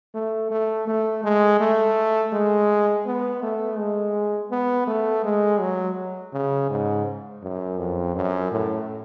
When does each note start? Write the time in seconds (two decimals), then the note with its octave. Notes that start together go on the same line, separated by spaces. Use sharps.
0.14 A3
0.51 A3
0.87 A3
1.24 G#3
1.60 A3
2.33 G#3
3.05 B3
3.43 A3
3.78 G#3
4.51 B3
4.87 A3
5.24 G#3
5.60 F#3
6.33 C#3
6.70 G#2
7.43 F#2
7.78 F2
8.15 F#2
8.51 A2